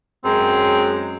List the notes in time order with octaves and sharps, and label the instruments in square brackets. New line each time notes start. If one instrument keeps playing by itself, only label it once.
[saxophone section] F#2 G#3 [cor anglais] C4